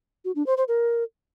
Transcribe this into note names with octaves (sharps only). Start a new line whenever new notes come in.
F#4
D4
C5
C5
A#4